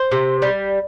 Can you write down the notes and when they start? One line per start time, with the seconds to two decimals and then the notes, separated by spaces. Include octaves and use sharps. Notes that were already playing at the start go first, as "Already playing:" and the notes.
Already playing: C5
0.12 C3
0.42 G3